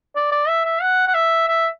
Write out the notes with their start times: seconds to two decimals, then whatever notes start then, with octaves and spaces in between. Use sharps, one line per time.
0.16 D5
0.32 D5
0.48 E5
0.65 E5
0.81 F#5
1.07 F#5
1.14 E5
1.48 E5